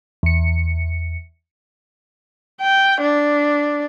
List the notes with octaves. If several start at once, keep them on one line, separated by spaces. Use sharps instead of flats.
E2 C#7
G5
D4